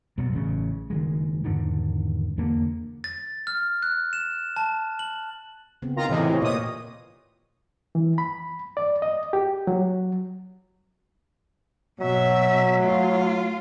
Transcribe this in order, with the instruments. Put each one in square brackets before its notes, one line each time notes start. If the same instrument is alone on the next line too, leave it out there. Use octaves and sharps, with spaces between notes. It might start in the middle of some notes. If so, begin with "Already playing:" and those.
[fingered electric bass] F#2 B2
A1 C#3
F#1 D#3 G#3
E2 G#2 D3 D#3
E2 D3 A#3
[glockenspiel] A6
F6
F#6
E7
A5
F#7
[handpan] C#3 B3 C4
[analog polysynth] D#3 F4 A#5
[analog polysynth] A2 C3 E3 [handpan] F4 D#5
[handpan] F4 G4 C#5
[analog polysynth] A#2 D#6 [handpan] C#5 D#5
[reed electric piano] E3
B5
D5
D#5
G4
F#3
[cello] B2 E5 [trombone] F#3
[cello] A3 F4